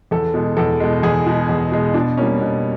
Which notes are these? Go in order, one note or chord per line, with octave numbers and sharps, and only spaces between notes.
E2 A4
B2 G#3
E2 A4
B2 G#3
E2 G#4
B2 G#3
E2
B2 G#3
B2 D4
G3 A#3 C#4
B2